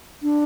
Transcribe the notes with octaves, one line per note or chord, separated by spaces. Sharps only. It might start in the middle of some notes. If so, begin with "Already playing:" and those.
D4